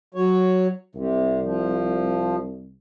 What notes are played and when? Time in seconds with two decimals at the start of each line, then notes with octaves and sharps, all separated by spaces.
0.15 F#3 C#5
0.95 C2 C3
1.43 F3